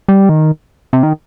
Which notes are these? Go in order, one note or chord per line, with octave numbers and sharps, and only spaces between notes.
G3
D#3
C3
D#3